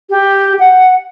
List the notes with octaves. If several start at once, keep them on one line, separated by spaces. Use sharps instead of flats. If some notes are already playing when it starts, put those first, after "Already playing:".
G4
F#5